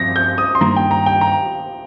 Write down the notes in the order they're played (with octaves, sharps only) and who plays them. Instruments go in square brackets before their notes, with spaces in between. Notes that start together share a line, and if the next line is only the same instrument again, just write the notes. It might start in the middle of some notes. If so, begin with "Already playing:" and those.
Already playing: [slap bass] G2 F3 C4 [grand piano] A#6
[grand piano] G6
D#6
C6
[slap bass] G2 D#3 A#3 [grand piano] A#5
[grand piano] G5
A#5
G5
A#5